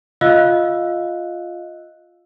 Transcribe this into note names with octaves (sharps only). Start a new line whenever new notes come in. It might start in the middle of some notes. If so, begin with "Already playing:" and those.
F4 D#5 F5 E6 F#6